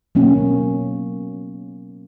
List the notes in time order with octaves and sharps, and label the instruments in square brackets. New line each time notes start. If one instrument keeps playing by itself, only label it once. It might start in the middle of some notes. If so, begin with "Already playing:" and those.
[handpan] B2 F#3 A#3 C#4